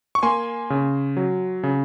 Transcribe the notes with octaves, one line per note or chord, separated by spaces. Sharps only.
C#6
A#3 G#5 C6
C#3
F#3
C#3